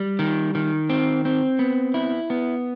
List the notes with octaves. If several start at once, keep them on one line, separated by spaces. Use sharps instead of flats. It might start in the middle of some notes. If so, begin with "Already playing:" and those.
Already playing: G3
D#3
D#3
C4
C4
B3
E4
B3